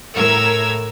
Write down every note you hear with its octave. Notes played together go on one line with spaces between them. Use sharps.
A2 A#4 E6 G#6